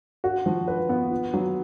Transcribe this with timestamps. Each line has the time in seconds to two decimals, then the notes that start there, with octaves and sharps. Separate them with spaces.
0.24 F#4
0.46 F3
0.68 B4
0.89 B3
1.11 F4
1.34 F#3